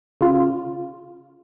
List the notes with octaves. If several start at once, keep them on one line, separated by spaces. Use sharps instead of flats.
C#3 F4